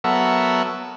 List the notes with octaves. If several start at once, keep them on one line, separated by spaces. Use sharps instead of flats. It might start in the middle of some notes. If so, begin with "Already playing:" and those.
F#3 B3 A4 A#4 E5 F#5